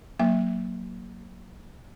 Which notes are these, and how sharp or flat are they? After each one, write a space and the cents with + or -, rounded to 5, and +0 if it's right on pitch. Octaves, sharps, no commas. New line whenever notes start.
F#3 +0 A#3 +0 E5 +0